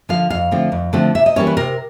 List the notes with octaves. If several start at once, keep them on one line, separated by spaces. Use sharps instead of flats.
D3 F3 F5
F2 F5
D3 F3 A3 C4
F2
D3 F3 A3 C4
C3 E5
D#5
E3 G3 A#3 C#4 C#5
B4
C3 A#4